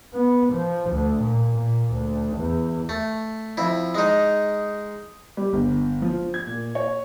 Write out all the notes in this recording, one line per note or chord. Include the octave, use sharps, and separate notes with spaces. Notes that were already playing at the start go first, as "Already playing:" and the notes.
B3
F3
D2
A#2
A#2
D2
E2
A3
F2 E4
G#3 D#4
G3
G1
F3
G#6
A#2
C#5